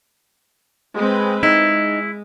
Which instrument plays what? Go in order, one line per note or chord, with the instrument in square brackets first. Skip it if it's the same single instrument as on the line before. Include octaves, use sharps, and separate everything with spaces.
[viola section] G#3 C4 B4
[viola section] G#3 [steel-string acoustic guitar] D#4 [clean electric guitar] E4